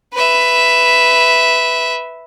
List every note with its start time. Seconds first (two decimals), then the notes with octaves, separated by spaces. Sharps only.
0.14 B4 E5